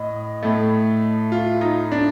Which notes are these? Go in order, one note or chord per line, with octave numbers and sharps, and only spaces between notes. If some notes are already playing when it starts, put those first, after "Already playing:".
Already playing: A2 D#5
A2 A3
F4
D#4
D4